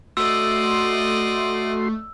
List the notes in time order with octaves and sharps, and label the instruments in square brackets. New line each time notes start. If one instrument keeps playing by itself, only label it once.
[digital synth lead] A3 [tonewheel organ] F#4 C6 [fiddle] D5 D#5 [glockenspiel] E6